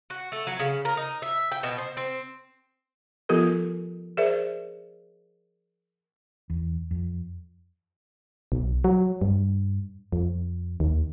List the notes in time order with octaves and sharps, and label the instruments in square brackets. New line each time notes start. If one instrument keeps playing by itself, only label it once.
[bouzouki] F#4
A3
F#3
C#3
A#4
D#4
E5
G5
B2
C5
C4
[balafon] F3 B3 F4 G4 A4 A#4
G#4 A#4 C5 D5 E5
[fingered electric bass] E2
F2
[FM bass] B1
F#3
G2
F2
D#2